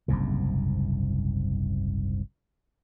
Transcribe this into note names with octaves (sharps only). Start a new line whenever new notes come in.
F#1 C2 G#2 C3